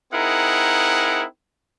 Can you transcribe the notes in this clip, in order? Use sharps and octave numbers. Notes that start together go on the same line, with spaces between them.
C4 D#4 E4 G#4 A#4 F#5